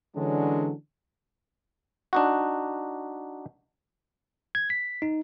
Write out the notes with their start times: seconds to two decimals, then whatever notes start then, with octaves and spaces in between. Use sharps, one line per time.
0.16 D3 E3 F#3 G#3 C#4 D4
2.13 D4 D#4 F#4
4.55 G#6
4.70 B6
5.02 D#4